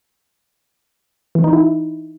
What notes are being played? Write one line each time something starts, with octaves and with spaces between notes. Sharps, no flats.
E3
D#4
E4